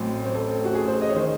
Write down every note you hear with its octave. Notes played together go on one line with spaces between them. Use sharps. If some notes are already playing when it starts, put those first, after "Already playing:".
Already playing: A1 A2 F#3 C4 C5
C5
A4
F#4
G#4
C5
D#5
C#5
D#3 C5